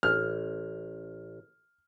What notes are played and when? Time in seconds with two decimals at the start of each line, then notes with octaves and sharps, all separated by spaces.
0.03 A1 F6